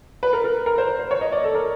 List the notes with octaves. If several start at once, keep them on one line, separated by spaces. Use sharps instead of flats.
B4
A#4
A#4
A#4
C5
C5
C5
C#5
D#5
D5
A4
A#4